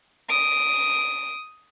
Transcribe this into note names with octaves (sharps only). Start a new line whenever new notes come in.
D#6 D7